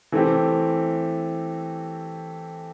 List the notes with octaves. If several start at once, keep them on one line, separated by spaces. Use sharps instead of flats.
E3 A3 C4 G4